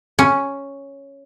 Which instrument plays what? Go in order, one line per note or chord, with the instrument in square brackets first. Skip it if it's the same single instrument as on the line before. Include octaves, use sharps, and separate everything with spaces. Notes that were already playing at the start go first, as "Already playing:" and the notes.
[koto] C#4